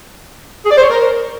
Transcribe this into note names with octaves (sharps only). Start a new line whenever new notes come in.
G#4
D5
C5
C#5
A#4